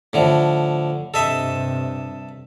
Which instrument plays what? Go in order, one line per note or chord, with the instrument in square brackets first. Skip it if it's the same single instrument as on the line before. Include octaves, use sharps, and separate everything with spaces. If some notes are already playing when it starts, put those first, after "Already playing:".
[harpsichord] A2 D3 F3
[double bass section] G2 C3 [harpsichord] A4 D#5 E5